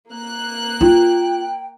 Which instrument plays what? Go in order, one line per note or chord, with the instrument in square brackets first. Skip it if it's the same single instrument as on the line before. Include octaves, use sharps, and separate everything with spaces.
[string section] A#3 F#6
[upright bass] F4 [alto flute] G5